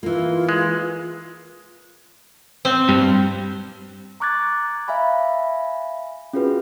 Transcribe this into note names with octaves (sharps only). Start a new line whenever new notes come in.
E3 A#3 F4
G#3
C4
G2
A#5 C#6 D6 F#6 G#6 A6
E5 F5 G#5 B5
C#4 F4 F#4 G#4 B4